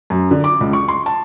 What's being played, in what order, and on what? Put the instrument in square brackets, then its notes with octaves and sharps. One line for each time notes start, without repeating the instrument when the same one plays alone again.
[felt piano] F#2
D3
D6
C#2
C#6
C6
A5